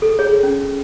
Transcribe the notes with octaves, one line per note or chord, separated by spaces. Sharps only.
A4
G#4 C#5
C#4